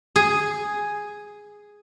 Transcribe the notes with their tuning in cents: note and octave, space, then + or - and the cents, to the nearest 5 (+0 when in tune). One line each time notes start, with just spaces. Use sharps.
G#4 +0